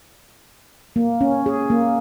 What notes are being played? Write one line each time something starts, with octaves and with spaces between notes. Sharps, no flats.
A#3
C#4
G#4
A#3